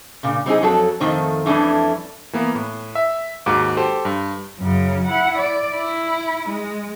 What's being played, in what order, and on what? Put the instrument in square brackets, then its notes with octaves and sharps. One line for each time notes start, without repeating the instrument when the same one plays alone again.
[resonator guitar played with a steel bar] A#2 C#3
G3 C4 D#4 G#4
F2 F#3 A4
F2 D#3 A3 C4
F2 E3 G3 A3 C#4 D4
[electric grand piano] E3 A#3 B3
A2
E5
D#2 G#2 F#4 D6
G4 A4 C5
G2
[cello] F#2 C#3
E4 F#5
D5
E4
G#3